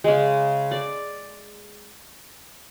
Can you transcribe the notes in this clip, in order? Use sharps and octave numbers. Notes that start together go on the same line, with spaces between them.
C#3 G#3
D5